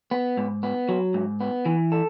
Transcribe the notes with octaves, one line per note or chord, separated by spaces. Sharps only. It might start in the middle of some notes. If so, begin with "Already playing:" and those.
B3
G#2
B3
F#3
G#2
B3
E3
A4